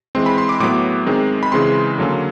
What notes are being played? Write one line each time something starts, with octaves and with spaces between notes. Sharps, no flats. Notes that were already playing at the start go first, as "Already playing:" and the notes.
E3 G#3 C4 C6
B5
C6
D6
A2 F#3 B3 D6
D#3 G#3 C4
B5
C#3 E3 G#3 C4 C6
D3 F#3 A#3 C#4